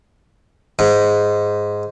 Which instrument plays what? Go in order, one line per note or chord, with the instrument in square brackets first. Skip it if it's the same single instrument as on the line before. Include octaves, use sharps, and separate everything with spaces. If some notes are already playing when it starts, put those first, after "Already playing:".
[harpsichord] G#2